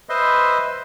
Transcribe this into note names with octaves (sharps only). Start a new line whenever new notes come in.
B4 C5 D#5 E5 C6